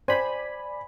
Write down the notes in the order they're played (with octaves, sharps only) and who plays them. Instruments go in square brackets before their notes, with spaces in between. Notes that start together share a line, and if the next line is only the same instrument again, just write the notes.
[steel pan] C5 [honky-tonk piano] D5 [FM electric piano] G#5 B5